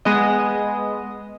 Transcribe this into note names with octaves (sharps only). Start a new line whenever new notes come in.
G#3 B3 D#5